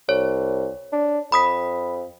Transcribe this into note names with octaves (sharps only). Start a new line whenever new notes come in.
C2 C#5
D4
F2 B5 D#6 B6